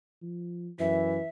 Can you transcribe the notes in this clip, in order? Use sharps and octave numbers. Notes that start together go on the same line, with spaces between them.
F3
F#2 E3 E5